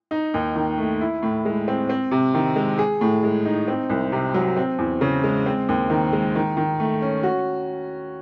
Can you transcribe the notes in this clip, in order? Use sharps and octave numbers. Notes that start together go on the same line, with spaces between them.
D#4
D#2
D#3
A3
E4
A2
G#3
C4
C4
C3
D#3
G#3
G#4
A2
G#3
D#4
C4
C2
C3
F#3
C4
E2
C#3
G#3
C4
D#2
D#3
G#3
D#3
D#3
A3
C#4
F#4